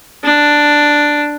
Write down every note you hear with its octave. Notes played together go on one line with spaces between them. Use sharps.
D4